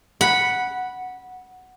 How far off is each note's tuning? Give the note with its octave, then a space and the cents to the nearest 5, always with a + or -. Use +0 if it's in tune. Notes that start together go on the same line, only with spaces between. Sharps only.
F#5 +0 B5 -15